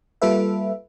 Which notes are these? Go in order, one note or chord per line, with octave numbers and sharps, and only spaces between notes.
G3 A#3 F4 A4 B4 E5